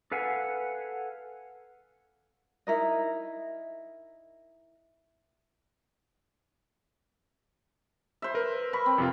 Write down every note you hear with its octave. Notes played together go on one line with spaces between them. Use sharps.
A4 B4 F5 F#5 G#5
D#4 E4 A#4 D#5
C5 E5
A#4 B4
B5 C#6
C4
F2 C3 F4